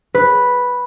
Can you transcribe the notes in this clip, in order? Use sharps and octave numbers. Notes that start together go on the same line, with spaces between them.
B4